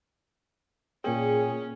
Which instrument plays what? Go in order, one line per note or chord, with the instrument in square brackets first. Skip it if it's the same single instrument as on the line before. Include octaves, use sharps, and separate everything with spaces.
[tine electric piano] A#2 A#3 G5 [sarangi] C#4 [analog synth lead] G#4